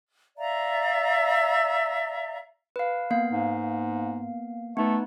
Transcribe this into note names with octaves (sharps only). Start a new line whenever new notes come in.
D5 E5 F5 A#5
B4 F5
A#3 B3 F5
G#2
A3 B3 D#4 B4